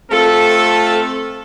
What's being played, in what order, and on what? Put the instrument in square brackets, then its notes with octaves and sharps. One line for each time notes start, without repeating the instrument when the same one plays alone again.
[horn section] A3 C4 F4 A4